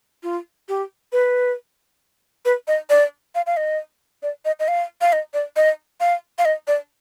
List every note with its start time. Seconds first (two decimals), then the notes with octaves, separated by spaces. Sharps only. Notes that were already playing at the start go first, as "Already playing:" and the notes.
0.23 F4
0.69 G4
1.13 B4
2.45 B4
2.68 D#5
2.90 D5
3.35 F5
3.46 F5
3.57 D#5
4.23 D5
4.45 D#5
4.60 D#5
4.68 F5
5.01 F5
5.13 D#5
5.34 D5
5.56 D#5
6.00 F5
6.38 F5
6.45 D#5
6.68 D5